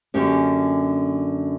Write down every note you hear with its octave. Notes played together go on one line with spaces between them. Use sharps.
F#2 D3 A#3 C#4 G4